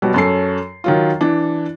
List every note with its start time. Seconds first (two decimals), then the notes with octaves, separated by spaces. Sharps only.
0.02 B2 F#3 G3
0.14 F#2 C#4 A4 C7
0.84 D#3 F#3 F4
1.21 E3 D4